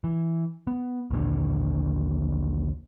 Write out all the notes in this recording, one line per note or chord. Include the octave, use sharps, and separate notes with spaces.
E3
B3
A#1 D#2 A#2 D3